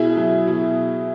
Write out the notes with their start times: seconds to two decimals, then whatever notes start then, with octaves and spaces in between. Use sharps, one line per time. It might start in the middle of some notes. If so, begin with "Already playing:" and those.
Already playing: B2 E4 G#4
0.17 F#3
0.47 B2